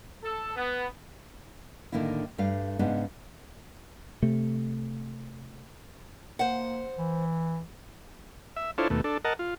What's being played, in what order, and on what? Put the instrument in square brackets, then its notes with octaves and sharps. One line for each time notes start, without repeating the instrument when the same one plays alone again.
[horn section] A4
B3
[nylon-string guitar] A2 D3 D#3 A#3 E4
G2 A3 D5 F5
G#2 C#3 B3 D4 D#4
[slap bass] C3 A3
[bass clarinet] A#3 [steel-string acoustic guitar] C5 F#5
[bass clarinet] E3
[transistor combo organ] E5
D4 E4 F4 A4 C5 C#5
D#2 B2 A3
D4 A4
A#4 D#5 F#5 A5
F4